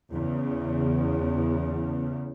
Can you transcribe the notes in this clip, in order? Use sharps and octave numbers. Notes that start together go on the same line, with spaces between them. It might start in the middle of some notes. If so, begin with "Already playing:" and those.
E2 C#3